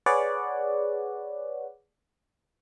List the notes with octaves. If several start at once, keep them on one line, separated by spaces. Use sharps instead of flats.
G#4 B4 C#5 D5 F#5